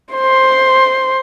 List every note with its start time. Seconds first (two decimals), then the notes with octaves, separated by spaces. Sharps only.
0.15 C5 C6